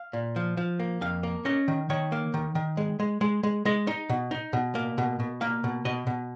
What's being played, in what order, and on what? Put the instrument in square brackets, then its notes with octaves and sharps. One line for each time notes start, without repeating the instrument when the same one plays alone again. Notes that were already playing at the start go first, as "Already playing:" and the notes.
Already playing: [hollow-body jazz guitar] F5
A#2
F3
F3
A#3
F2 F5
A#3
C#4 D#5
D#3
D#3 C#5
A#3
D#3
D#3
G#3
G#3
G#3
G#3
G#3 D#5
D#4
B2
D#4
B2
A#3
B2
B2
A#3 F5
B2
B2 D#5
B2